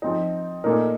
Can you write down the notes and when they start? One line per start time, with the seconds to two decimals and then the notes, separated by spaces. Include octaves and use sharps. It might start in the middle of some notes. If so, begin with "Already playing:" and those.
0.02 F3 C4 D#4
0.64 A#2 A3 D#4 A#4